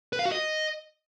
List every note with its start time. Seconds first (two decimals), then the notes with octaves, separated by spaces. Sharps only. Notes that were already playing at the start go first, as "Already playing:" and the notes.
0.13 B4
0.19 F5
0.25 F#4
0.32 D#5